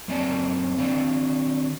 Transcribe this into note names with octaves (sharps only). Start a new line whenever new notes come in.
F#2 A#3 C4 D5 G#5 A5
D#3 C4 D4 D5 F5